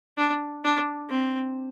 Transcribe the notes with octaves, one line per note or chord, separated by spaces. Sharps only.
D4
D4
C4